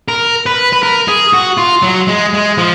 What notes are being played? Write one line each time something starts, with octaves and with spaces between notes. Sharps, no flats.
A#4
B4
B4
A#4
G#4
F#4
F4
F#3
G#3
G#3
F3